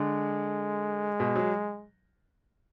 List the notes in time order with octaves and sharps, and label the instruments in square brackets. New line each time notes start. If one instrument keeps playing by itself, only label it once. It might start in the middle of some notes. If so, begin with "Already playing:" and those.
Already playing: [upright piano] D3 [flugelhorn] G#3
[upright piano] B2
F#3